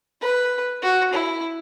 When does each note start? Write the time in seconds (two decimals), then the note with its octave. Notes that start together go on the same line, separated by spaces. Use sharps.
0.22 B4
0.82 F#4
1.14 E4